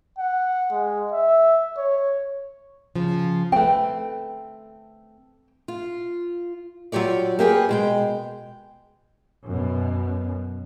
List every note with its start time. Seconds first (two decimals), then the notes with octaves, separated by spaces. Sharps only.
0.18 F#5
0.72 G#3
1.12 E5
1.77 C#5
2.96 C#3 F3
3.52 A3 C4 B4 G5
5.68 F4
6.92 F#3 F4 G4 C#5 D5
7.39 A#3 G4 G#4 B4
7.69 B2 G#3 G5
9.46 F#2 B2